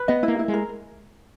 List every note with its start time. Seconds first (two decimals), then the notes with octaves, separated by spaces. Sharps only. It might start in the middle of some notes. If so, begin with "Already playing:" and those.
Already playing: B4
0.08 B3 D#5
0.23 E4
0.28 A#3
0.39 E4
0.48 G#3
0.54 A#4